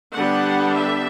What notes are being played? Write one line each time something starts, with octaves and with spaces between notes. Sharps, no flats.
D3 G3 B3 D4 F#5
E5